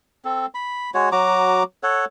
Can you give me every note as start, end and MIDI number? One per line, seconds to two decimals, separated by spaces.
0.25 0.46 60
0.25 0.46 69
0.54 0.90 83
0.94 1.09 56
0.94 1.09 66
0.94 1.09 73
1.12 1.63 54
1.12 1.63 66
1.12 1.63 82
1.12 1.63 86
1.83 2.05 69
1.83 2.05 73
1.83 2.05 78